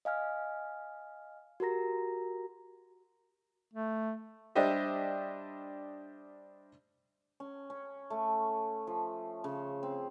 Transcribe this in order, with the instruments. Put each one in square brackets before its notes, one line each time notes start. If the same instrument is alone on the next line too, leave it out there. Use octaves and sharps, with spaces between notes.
[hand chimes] D#5 F5 G#5 F6
F#4 G4 A#4 A#5 A#6
[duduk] A3
[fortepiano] G3 D4 G4 C5 D#5 E5
[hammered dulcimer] C#4
C#4
A3
F3
C#3
C4